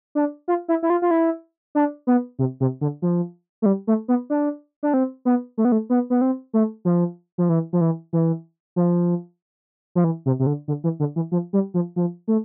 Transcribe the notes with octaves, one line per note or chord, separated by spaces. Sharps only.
D4
F4
E4
E4
F4
F4
E4
D4
B3
C3
C3
D3
F3
A3
G3
A3
B3
D4
D4
C4
B3
A3
B3
A3
B3
B3
C4
A3
F3
F3
E3
F3
E3
E3
F3
F3
E3
C3
C3
D3
D3
E3
D3
E3
F3
G3
F3
F3
A3